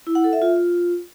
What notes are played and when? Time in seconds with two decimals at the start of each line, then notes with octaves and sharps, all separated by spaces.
0.07 E4
0.15 F#5
0.24 A4
0.33 E5
0.42 F4